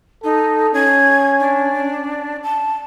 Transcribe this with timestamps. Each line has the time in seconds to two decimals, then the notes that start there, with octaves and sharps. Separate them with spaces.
0.24 D#4 A4
0.74 C#4 G#6
1.39 D4
2.43 A5